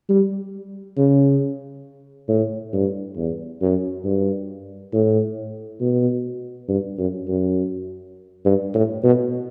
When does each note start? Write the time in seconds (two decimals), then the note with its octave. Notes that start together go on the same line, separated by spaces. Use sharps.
0.09 G3
0.97 C#3
2.29 A2
2.73 G2
3.17 E2
3.62 F#2
4.05 G2
4.94 A2
5.81 B2
6.69 G2
6.98 F#2
7.28 F#2
8.45 G2
8.74 A2
9.04 B2